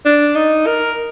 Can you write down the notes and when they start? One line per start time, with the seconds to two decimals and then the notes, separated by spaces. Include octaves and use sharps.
0.05 D4
0.36 D#4
0.67 A#4